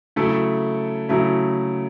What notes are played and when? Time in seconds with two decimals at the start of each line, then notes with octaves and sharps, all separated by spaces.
0.16 C#3 F#3 A3 E4 A4
1.09 C#3 F#3 A3 E4 A4